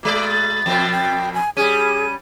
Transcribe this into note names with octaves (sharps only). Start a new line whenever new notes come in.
B2 G#3 D5 D6
A6
F2 B2 C4 G5
G5
G#5
G3 C#4 G#4 D#7